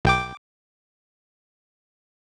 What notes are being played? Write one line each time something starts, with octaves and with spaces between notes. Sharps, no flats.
B1 G5 D6